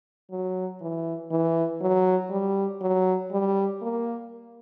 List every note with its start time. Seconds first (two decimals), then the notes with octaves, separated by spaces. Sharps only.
0.31 F#3
0.81 E3
1.31 E3
1.81 F#3
2.31 G3
2.81 F#3
3.32 G3
3.82 A#3